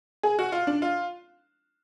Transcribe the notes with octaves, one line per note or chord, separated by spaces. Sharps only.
G#4
F#4
F4
D4
F4